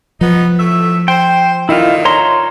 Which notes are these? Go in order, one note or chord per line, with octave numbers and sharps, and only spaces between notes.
F3 B3 D#4
A2 A3 E5
C5 G5
A#2 D3 D#3 E4 F4
C#5 A#5 C6